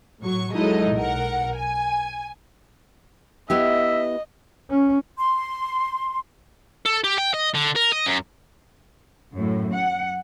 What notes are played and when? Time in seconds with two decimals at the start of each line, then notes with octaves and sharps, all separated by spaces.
0.21 A2 F#3 C#6
0.53 F#3 G#3 D#4 E4 A4 D#5
0.93 B1 A#4 F#5
1.56 G#5
3.50 B3 E4 G4 D#5 E5
4.70 C#4
5.18 C6
6.86 A4
7.04 G4
7.18 G5
7.34 D#5
7.55 D3
7.76 A#4
7.92 D#5
8.06 F#2
9.34 F#2 A2
9.73 F#5